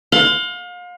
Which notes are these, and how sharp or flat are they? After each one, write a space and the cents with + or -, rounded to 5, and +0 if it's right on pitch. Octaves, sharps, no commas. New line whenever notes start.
F5 +35 C6 -25